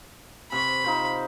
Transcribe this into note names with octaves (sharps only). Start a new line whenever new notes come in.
C3 C5 B5 C#6
D#4 F4 C5